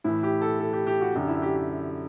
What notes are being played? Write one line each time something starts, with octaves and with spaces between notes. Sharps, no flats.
A2 E3 E4
G4
A4
A4
G4
G4
F#4
F#2 D3 G4
E4
G4
G4